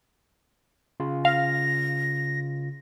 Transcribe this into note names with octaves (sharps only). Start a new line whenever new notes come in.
C#3 F4
F5 A#6